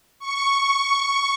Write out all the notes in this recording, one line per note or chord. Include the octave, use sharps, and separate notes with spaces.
C#6